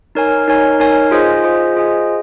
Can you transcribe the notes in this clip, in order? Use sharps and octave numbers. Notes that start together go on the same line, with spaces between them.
D#4 A#4 C#5 G#5
D#4 A#4 C#5 G#5
D#4 A#4 C#5 G#5
F4 G#4 C5 D#5 G#5
F4 G#4 C5 D#5 G#5
F4 G#4 C5 D#5 G#5